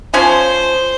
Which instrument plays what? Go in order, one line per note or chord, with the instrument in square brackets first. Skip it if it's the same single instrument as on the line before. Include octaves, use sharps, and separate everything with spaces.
[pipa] F3 C#4 G#5 [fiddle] C5